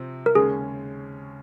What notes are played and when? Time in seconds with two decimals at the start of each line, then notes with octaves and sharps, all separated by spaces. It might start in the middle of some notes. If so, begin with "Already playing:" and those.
Already playing: C3 F3 C4
0.26 A#4
0.35 D#2 C#3 G#3 C#4 G#4